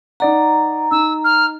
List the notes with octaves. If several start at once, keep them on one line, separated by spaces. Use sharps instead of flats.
D#4 D5 F#5 A#5
D#4 E6
F6